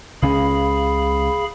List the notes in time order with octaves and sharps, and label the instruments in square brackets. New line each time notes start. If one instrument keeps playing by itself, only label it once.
[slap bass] C#2 C#3 C#4 [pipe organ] G#4 F5 B5